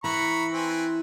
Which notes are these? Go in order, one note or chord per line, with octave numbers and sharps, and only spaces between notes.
E3 A#5 B5 C#6
C4 B4 G#5